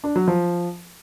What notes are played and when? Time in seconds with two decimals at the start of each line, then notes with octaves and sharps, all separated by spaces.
0.04 D4
0.16 F#3
0.28 F3